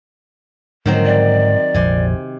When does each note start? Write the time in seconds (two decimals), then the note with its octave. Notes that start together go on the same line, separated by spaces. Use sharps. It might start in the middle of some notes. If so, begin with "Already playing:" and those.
0.86 G#2 D3 D#3 F3 F#3 C4
1.05 D5
1.74 A#1 F2 C3 G#5